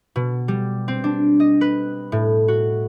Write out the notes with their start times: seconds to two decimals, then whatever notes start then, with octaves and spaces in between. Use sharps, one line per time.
0.16 B2
0.48 G3
0.88 C4
1.04 D4
1.40 D#5
1.61 B4
2.12 A2
2.48 F#4